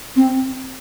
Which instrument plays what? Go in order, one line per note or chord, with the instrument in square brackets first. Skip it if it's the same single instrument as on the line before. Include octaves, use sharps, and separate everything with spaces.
[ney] C4